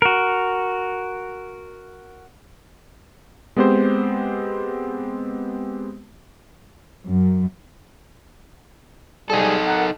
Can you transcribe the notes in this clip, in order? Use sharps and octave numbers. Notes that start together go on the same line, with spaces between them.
F#4 A#4
G#3 B3 C4 G4 C5
F#2
G#2 G3 D#4 G#4 A4
A#4 F#5